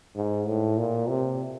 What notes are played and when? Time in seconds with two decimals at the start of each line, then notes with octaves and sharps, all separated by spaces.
0.16 G#2
0.47 A2
0.77 A#2
1.09 C3